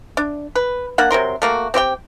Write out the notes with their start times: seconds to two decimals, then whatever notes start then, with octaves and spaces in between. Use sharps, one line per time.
0.17 D4
0.55 B4
0.98 A#3 D4 F#5
1.10 C3 F#3 A#4 C6
1.42 A3 A#3 F#4
1.74 C4 G4 C5 G5